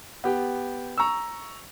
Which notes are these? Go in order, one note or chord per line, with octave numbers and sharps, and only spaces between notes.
B3 G4
A#5 C#6 E6